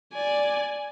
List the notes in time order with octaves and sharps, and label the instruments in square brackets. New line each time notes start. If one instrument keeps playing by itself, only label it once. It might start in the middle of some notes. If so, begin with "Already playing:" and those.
[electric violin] D5 G#5